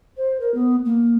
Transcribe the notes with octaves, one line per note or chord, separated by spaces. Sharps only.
C5
A#4
B3
A#3